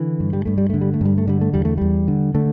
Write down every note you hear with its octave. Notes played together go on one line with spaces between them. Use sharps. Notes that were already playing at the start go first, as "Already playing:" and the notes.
Already playing: D3 E3
G2
G3
G2 A3
G3
D3 A3
G3
A3
G2 G3
A3
D3 G3
A3
E2 G3
A3
E2 G3
D3
D3 A3